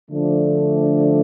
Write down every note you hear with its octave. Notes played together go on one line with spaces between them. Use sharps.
D3 F3 A3 D4